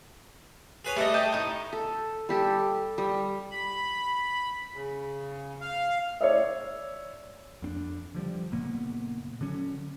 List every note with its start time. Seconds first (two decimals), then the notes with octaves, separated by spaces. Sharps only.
0.85 G#4 B4 C#5
0.96 G3 A3 A4 D#5
1.14 D#5 G5 A5
1.32 A2 D#4
1.73 A4
2.29 G3 G4 A4
2.98 G3
3.51 B5
4.73 C#3
5.61 F5
6.21 C#5 D5 E5
7.62 F2 C4 D4
8.15 D3 F3 G3
8.52 F#1 A#2 A#3 B3
9.41 D3 F#3 C#4